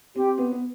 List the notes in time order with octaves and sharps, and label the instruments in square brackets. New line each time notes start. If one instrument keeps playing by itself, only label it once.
[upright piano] C4 [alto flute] G4
[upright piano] B3
B3